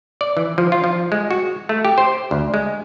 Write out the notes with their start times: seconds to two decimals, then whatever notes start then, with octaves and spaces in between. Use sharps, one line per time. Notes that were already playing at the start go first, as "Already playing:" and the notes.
0.21 D5
0.37 E3
0.58 F3
0.72 F4
0.84 F3
1.12 G#3
1.31 F#4
1.69 A3
1.85 G4
1.98 C5
2.31 D2
2.54 G#3